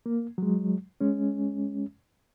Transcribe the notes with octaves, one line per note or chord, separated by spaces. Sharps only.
A#3
F#3 G#3
G#3 C#4